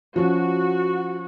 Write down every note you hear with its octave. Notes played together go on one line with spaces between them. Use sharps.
F3 C#4 F#4